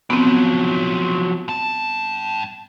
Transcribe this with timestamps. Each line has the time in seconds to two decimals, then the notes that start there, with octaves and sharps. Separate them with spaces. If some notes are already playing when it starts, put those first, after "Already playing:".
0.10 F3 F#3 B3 C4
1.48 G2 A5